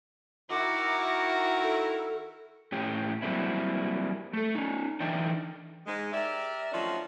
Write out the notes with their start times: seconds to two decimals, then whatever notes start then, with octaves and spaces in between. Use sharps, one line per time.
0.50 D#3 E4 F#4 A#4 D6
1.61 A4
2.72 A2 C#4 G4
3.22 F#3 G3 A#3 C4 E4
4.33 A3 A4
4.55 C#4 D#4
5.00 E3 D4 D#4 D5 E5 G5
5.86 G#2 G#3
6.12 G4 A#4 D5 E5
6.71 D#3 F3 F#3 A3 C#4 D4